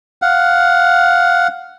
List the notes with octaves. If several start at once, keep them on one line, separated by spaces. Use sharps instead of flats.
F5 F#5